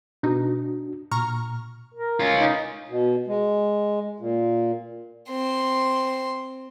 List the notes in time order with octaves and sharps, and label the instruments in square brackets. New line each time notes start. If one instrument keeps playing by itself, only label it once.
[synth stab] B2 D#4 [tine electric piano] D4 F#4
[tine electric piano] A#2 [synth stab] A#5 C#6 F6
[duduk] A#4
[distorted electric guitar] C#4 F4
[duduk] D#4
[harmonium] B2
G#3
A#2
[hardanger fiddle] C4 C6